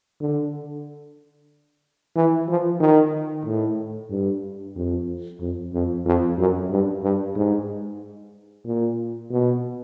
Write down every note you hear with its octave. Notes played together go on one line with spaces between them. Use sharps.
D3
E3
F3
D#3
A2
G2
F2
F2
F2
F2
F#2
G2
G2
G#2
A#2
B2